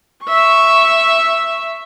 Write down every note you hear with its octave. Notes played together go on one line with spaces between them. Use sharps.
E5 C#6